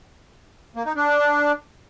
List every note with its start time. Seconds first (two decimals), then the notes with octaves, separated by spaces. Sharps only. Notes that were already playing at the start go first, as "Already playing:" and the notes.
0.76 A#3
0.86 D#4
0.96 D4